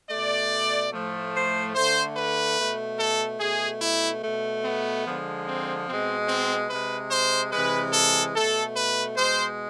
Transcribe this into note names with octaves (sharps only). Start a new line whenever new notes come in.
B2 A3 D5
A2 F3 A3
C5
D3 A3 C5
B4
B2 A3
A4
B2 A3 G#4
E4
B2 A3
B3
D3 F3 G#3
C4
B2 G#3 C4
C4
C3 G#3 B4
C5
C3 E3 G#3 B4
A4
B2 A3 A4
B4
B2 G#3 C5